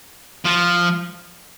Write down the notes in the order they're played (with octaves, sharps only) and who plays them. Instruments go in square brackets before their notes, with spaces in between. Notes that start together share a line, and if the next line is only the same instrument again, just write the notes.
[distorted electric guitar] F3